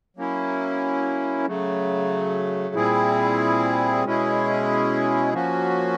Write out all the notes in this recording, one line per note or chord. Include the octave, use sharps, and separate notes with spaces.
F#3 A#3 C#4 E4
C#3 F#3 A3
A#2 G3 C4 E4 G#4
B2 G#3 C#4 E4 G#4
F3 A#3 C#4 F#4